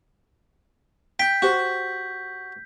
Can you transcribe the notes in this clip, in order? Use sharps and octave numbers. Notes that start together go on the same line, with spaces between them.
G5 G6 B6
F#4 G4 C5